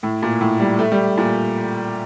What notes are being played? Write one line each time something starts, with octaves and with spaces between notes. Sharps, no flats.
A2
A#2
A2
G3
A3
G3
A#2